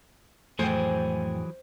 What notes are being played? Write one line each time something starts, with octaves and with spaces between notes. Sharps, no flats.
F2 A2 E3 F#3 A3 G#4 C5 G5